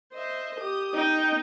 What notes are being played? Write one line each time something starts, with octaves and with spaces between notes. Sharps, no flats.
C5 D#5 E5
G4 D#6
D#4 G5